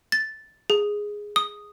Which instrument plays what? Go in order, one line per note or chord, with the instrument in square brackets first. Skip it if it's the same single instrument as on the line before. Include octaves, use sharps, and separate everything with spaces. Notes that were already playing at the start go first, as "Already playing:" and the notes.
[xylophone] A6
G#4
D#6